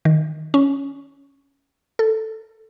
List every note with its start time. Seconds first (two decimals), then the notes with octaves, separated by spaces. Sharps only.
0.05 D#3
0.54 C#4
1.99 A4